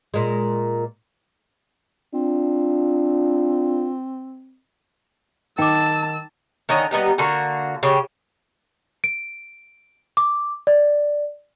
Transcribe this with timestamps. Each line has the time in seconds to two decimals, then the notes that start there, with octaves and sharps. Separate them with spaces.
0.14 A#2 G#3
2.14 C4 D4 F4
5.58 D#3 G5 A5 D6 E6
6.69 D3 D#3 C#4 D#5
6.91 G3 B3 D#4 G4
7.18 D3 A#3 F#4
7.83 C#3 G4
9.04 D7
10.17 D6
10.67 D5